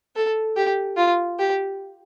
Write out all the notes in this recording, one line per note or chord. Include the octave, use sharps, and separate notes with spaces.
A4
G4
F4
G4